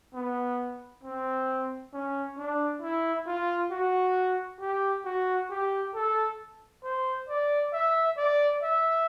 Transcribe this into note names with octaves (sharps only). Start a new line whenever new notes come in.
B3
C4
C#4
D4
E4
F4
F#4
G4
F#4
G4
A4
C5
D5
E5
D5
E5